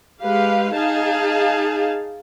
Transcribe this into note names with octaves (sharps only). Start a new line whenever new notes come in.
G#3 G4 B4 F5
D#4 G#4 F5 A5